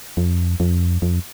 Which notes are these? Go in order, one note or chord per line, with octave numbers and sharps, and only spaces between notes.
F2
F2
F2